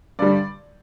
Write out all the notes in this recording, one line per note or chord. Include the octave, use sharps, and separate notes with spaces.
G2 D3 G3 D5